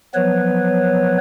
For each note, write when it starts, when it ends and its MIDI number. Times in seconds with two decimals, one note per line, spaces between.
0.15 1.18 53
0.15 1.18 54
0.15 1.18 59
0.15 1.18 71
0.15 1.18 73